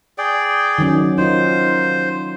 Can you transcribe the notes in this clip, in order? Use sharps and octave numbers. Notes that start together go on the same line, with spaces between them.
G#4 D5 G5
D#3 F#3 C#4
D#4 F4 C5